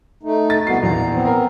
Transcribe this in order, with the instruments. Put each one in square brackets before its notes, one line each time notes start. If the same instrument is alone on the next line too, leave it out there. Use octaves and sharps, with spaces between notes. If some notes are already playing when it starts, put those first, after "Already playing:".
[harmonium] A3 D#4
[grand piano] A6
[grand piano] C2 C7 [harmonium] B3 F#4
[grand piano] A#1 E2 [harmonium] A#5
[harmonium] B3 C4
[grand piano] A#4 A#5